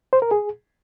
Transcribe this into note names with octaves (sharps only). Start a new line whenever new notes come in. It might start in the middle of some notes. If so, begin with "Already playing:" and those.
C5
A#4
G#4